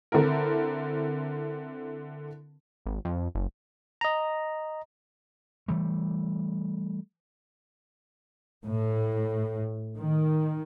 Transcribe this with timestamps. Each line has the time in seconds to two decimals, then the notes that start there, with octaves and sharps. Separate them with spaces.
0.12 D3 C4 E4 A#4
2.86 G#1
3.05 F2
3.35 F#1
4.01 D#5 A#5
5.68 E3 G3 A3
8.64 A2
9.97 D#3